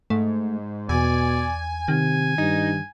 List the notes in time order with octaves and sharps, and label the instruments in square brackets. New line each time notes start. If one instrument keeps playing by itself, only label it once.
[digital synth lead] G#2 [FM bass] A3
[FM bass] E2 [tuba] B2 [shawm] D5 [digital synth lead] G#5
[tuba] C3 [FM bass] D#3 [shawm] G#5
[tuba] G2 [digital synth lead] D#4